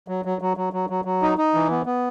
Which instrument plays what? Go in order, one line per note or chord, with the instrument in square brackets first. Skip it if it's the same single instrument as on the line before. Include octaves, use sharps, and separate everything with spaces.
[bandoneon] F#3
F#3
F#3
F#3
F#3
F#3
F#3
D#4
D#4
E3
B3
B3